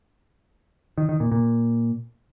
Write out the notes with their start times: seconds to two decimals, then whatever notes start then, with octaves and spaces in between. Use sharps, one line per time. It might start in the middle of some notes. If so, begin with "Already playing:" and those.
0.98 D#3
1.09 D#3
1.20 A#2
1.31 A#2